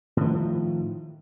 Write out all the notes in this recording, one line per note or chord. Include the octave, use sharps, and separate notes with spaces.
A2 D#3 F3